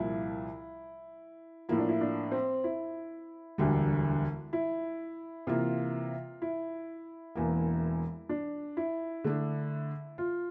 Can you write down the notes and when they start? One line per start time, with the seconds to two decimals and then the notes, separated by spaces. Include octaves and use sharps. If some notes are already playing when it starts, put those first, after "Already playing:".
Already playing: C2 A#2 F3 E4
1.69 A2 F3 A#3 E4
1.79 D4
1.89 E4
2.01 D4
2.32 C4
2.64 E4
3.58 E1 D2 D3 G3
4.53 E4
5.47 C3 E3 A#3 F4
6.42 E4
7.35 E1 E2 E3 A#3
8.29 D4
8.77 E4
9.24 D3 A3 D4
10.18 F4